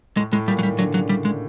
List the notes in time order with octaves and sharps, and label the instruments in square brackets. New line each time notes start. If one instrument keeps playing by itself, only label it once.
[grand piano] A2 [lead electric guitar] G#3
[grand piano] A2 [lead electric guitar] G#3
[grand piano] A#2 [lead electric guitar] G3
[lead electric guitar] F#3
[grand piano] D#3 [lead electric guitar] G3
[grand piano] D3 [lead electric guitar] F#3
[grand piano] C#3 [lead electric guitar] F#3
[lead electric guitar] G3
G#3